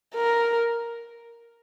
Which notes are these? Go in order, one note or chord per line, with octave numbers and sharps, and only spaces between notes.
A#4